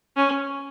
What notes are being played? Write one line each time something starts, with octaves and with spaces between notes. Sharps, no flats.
C#4